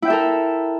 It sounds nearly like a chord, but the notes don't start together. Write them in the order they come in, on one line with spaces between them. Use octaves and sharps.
E4 G5 E5 A4 A#4